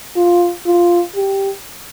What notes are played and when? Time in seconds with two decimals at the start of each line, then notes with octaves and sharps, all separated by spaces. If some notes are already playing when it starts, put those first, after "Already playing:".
0.16 F4
0.66 F4
1.16 G4